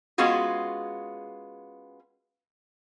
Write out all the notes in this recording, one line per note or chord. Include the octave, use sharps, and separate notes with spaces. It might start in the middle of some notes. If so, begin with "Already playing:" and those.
G#3 B3 C#4 F4 F#4 G#4